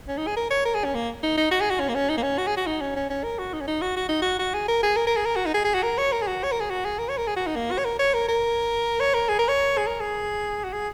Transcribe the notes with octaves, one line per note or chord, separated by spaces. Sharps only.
C#4
D#4
G#4
A#4
C#5
A#4
G#4
C#4
A#3
D#4
D#4
F#4
G#4
F#4
C#4
A#3
C#4
D#4
A#3
C#4
F#4
G#4
F#4
D#4
C#4
C#4
C#4
A#4
F#4
D#4
C#4
D#4
F#4
F#4
D#4
F#4
F#4
G#4
A#4
G#4
A#4
A#4
G#4
A#4
F#4
D#4
G#4
G#4
F#4
A#4
C#5
A#4
G#4
F#4
C#5
A#4
G#4
F#4
G#4
A#4
C#5
A#4
G#4
F#4
D#4
A#3
F#4
C#5
A#4
C#5
A#4
A#4
C#5
A#4
G#4
A#4
C#5
G#4
A#4
G#4
F#4
G#4